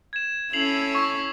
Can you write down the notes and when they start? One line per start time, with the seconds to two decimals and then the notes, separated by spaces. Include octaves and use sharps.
0.13 G#6 E7
0.53 C#4 E4 A4 C7 F7 F#7
0.95 C#6